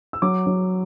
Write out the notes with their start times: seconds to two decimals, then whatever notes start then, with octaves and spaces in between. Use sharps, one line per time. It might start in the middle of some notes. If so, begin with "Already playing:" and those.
0.13 E6
0.22 F#3 D6
0.47 F#3